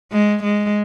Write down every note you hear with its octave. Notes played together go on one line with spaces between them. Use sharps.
G#3
G#3